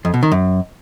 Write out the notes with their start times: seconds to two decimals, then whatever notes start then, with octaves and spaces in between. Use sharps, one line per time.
0.05 F2
0.14 B2
0.23 D#3
0.32 F#2